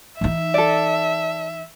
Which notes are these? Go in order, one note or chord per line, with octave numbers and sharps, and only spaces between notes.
E3 D#4 E5
A4 D5